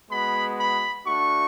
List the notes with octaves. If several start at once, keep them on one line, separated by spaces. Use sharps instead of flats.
G#3 B3 F#4 B5
B5
A3 D4 F#4 C#6